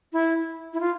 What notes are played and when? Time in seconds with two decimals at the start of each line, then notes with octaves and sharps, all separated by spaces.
0.13 E4
0.73 E4
0.80 F4